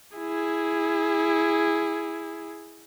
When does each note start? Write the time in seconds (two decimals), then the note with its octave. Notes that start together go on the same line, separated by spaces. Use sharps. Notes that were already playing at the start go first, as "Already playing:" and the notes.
0.17 E4 G#4